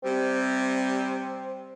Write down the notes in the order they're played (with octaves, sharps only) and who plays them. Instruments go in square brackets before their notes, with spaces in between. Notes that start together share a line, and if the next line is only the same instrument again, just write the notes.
[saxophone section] C3 G3 [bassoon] C4